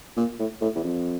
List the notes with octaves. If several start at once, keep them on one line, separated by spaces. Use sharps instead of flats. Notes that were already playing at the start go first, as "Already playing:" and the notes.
A#2
A2
A2
E2
F2